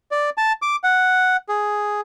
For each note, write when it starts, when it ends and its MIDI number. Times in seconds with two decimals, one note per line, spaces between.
0.11 0.30 74
0.38 0.53 81
0.62 0.76 86
0.84 1.37 78
1.49 2.01 68